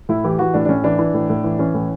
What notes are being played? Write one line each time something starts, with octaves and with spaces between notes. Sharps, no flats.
A2 E4
E3 G4
E3 F#4
A2 D4
D4
A2 C#4
E3 D4
E3
A2
A2
E3
E3 C#4
A2